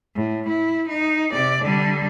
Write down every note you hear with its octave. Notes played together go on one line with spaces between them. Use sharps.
A2
E4
D#4
C3 D5
D3 G3